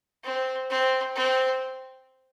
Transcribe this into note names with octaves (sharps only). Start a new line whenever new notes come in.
C4
C4
C4